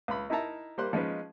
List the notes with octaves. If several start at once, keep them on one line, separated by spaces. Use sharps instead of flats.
C#2 B5
D#4 E4 A#4 E5 A5 A#5
G3 A#3 C5 C6 F#6
F3 G#3 C#4 D#4 B4